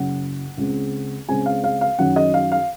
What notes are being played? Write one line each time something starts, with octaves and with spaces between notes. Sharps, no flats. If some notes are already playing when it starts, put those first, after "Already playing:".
Already playing: F#1 F#2 C#3 F#5
C#2 C#3 G#3 C4
C#2 C#3 G#3 C4 G#5
F5
F5
F5
F#2 D#3 F#3 C#4 F#5
D#5
F5
F5